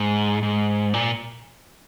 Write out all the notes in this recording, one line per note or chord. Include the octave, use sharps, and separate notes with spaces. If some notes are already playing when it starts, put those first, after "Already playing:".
Already playing: G#2
G#2
A#2